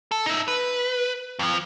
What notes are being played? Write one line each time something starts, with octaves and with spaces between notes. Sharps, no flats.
A4
D#4 E5
B4
F2 F3